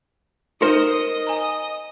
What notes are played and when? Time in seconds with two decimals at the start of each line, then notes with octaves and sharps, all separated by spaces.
0.62 D#4 A#4 C5 D#5 D#6
1.27 G#5 A#5